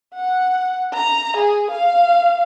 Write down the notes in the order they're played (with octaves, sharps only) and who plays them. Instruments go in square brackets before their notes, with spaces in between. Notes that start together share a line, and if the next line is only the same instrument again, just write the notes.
[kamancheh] F#5
A#5
G#4
F5